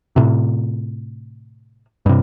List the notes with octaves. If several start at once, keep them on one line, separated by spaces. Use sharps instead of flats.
A2 C3
G2 C3